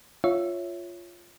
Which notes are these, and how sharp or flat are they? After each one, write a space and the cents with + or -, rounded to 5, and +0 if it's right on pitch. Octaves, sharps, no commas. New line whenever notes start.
F4 +0 C#5 +0 E5 +0